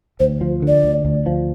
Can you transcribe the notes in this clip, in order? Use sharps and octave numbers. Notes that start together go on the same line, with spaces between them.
D2 C5
F3
D3
D5
D2
D2
F3